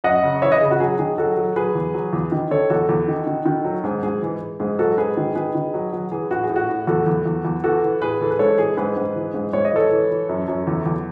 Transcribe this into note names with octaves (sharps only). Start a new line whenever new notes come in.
F#2 D#5 F#5
C#3
E3 C#5 E5
B4 D#5
C#3 G#4
F#4
F#3 G#4
D#3 G#4
F#3 F#4 A4
F#3
F#3 G#4 B4
E2
F#3
E2
D#3
D#3 A4 C#5
E2 F#4 A4
E2
D#3
D#3
D#3
F#3
G#2 G#4
G#2 G#4
E3
E3
G#2 G#4
F#3 F#4 A4
G#2 G#4 B4
D#3
D#3 G#4 B4
D#3
F#3
F#3
E3 G#4
A2 F#4
G#4
A2
F#4
A2
E2 F#4 A4
E2
E2
E2
E3 F#4 A4
E3
A2 G#4 B4
E3 A4
B4
G#2 A4 C#5
E3 G#4
G#2 G#4 B4
G#2
E3
G#2
G#2 C#5
D#5
E3 A4 C#5
E3
E3
F#2
F#2
E2
E2